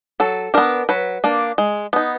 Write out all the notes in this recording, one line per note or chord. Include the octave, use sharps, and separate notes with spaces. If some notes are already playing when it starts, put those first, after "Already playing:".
F#3 A4
B3 D4 A#4
F#3 B4
A#3 D4
G#3
B3 D#4